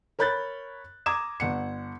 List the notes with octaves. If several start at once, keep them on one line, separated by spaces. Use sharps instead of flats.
A#4 C#5 B5 F#6 G6 A6
A#5 D6 D#6 G#6 E7
G1 F#5 C#7